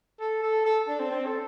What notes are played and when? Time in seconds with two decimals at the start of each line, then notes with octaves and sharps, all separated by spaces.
0.20 A4
0.42 A4
0.66 A4
0.88 D4
1.00 C4
1.11 C4
1.26 A4